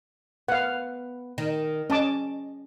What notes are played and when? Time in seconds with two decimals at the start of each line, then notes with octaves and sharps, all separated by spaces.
0.48 B3 F5 F#5
1.38 D#3
1.90 C#4 D#5 A5 D6